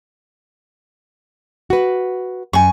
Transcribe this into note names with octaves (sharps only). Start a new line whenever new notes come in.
F#4 B4
F#2 G#5 C#6